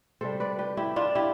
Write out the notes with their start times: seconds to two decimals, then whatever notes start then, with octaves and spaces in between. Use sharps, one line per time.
0.21 C3 G3 A4 C5
0.40 B4 D5
0.58 G4 B4
0.77 E4 G4
0.96 D4 F4
1.15 E4 G4